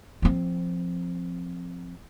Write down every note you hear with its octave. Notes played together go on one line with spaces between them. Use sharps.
F3 C4